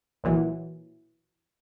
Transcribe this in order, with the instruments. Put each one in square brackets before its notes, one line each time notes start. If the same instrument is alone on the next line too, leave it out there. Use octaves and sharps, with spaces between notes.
[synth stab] B1 A#2 E3 F#3